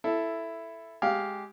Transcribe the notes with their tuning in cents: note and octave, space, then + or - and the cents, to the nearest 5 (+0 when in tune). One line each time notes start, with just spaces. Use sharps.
E4 +5 A4 +0
G#3 +0 G4 -10 F5 +0